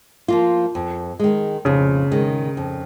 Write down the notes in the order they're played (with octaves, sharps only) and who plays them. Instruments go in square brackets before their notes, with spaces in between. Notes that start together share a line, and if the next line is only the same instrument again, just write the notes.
[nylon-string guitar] F3 A#3 F4
F2
D#3 G#3
[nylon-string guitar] F2 [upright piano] C#3
[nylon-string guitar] D#3 G#3
F2